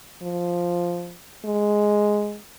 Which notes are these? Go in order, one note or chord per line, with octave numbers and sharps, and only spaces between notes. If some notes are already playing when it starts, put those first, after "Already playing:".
F3
G#3